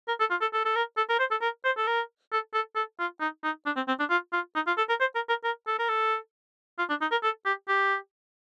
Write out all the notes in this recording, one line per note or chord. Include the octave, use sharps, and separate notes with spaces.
A#4
A4
F4
A4
A4
A4
A#4
A4
A#4
C5
A4
A#4
C5
A4
A#4
A4
A4
A4
F4
D#4
D#4
D4
C4
C4
D4
F4
F4
D#4
F4
A4
A#4
C5
A#4
A#4
A#4
A4
A#4
A4
F4
D4
D#4
A#4
A4
G4
G4